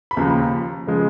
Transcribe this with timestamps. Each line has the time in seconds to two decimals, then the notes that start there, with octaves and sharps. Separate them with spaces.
0.11 B5
0.17 D#2 C#3 F3 A#5
0.87 C#3 F3 G#3